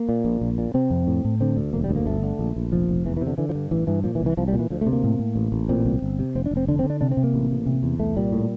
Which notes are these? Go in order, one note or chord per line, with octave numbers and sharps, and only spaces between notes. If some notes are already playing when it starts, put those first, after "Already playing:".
Already playing: A#3
A#2
A#1
A#1
A#2
C3 C4
F2
A2
A2
D3 C4
D2
E1 A#3
G3
D2
A#3
G1 A3
D3
A#1
A#1
F1 F3
F1
E2 E3
E3
C3
D3
D3 E3
F3
G2
A1 E3
G2 E3
A#2 F3
E3
C2
E3
C2 F3
G3
A#2
E3
D2 F3
A3
C3
A#3
A2
A2
A1
A1
A#2 C4
C2
G1
C3
F1 C4
D4
F1
C4
D3 D4
C4
D3
D4
C3 D4
C4
C3
A#3
A1
A1
C3
E2
C2 A3
A#2 G3
A2